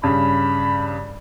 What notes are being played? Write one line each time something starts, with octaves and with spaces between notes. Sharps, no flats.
G2 C#3 B5